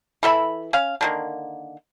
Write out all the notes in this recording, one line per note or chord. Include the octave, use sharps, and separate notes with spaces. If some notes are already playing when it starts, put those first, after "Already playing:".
E3 A4 E5 B5
C#4 F5
D3 D#3 A#3